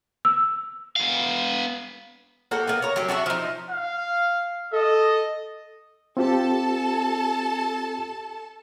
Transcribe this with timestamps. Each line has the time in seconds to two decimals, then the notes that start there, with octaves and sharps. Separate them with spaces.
0.25 E6
0.96 B3 F5
2.51 A#3 F#4 G4 A4
2.67 A#3 B3
2.82 C#5 A#5
2.96 F#3 G4
3.08 D4 F#4 D5 E5
3.26 F3 D#4
3.70 F5
4.73 A4 D#5
6.17 C4 F4 G4 A4 A5